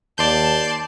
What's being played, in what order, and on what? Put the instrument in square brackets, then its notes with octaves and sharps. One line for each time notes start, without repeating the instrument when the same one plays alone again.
[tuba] D#2 [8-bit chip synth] D5 C6 G6 [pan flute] A5